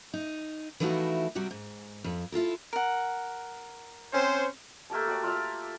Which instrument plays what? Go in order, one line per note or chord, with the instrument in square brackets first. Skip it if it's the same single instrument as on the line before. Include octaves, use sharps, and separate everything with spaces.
[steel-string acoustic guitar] D#4
E3 F3 A3 D#4 E4 F#4
C3 F#3 G3 F#4 G4
G#2
F2
E4 F4 A4 A#4
[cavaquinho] A#4 F#5
[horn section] C4 C#4 C5
[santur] A3 A#3 G4 A5
F#4 G4 D5
F4 D5 E5 F5